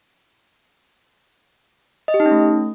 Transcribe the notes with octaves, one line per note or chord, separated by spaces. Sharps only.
D#5
G4
D#4
C#4
A3